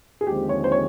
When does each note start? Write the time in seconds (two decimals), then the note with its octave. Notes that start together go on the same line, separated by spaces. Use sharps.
0.21 G#4
0.26 D#2 D3 F3 G#3 C4 G4
0.49 C#5
0.64 C5
0.72 C#5